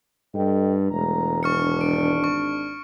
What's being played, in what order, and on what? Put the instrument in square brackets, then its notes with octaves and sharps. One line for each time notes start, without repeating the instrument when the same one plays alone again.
[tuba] G2 [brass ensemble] A4 D#5 G5
[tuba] E1 [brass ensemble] G#3 A3 A#5
[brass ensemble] G#1 D4 [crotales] C#6 F6 C#7
[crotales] D7
C#6